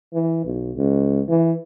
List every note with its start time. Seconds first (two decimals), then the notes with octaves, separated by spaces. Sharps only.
0.13 E3
0.45 B1
0.76 C#2
1.29 E3